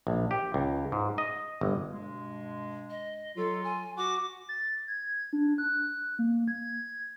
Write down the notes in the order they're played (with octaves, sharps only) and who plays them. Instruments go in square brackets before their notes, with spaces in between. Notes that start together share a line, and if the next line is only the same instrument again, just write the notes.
[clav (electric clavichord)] A#1
G4
C#2
G#2
D#5
G1
[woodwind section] G2 B2 G#3
[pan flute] D#5
[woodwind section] F#3 F4 [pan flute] A4
[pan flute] G#5
[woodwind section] F#4 [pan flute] D6
[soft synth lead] A6
G#6
D4
F#6
A#3
G#6